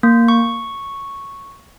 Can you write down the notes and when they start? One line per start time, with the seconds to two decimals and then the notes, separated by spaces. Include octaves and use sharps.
0.03 A#3
0.28 C#6